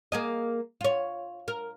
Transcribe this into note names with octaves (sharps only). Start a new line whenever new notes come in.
A#3 G#4 D#5
F4 C#5
A#4